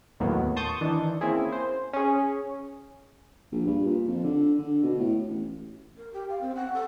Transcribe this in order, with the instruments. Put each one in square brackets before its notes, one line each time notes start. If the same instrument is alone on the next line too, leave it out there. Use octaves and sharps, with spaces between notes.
[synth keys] D#2 A2 D#3 F#3 A#3 B3
A5 C6 C#6 D#6 G6 A6
D#3 E3 D4
A#3 C4 C#4 E4 G#4
C5
C#4 G#4
[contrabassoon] A#1
G2
A#2
F2
D3
D3
B2
A2
A1
[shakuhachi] A#4
G4
F5
C4
F#5
A4